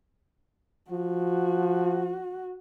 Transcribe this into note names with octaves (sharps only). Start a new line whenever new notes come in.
F3 F#4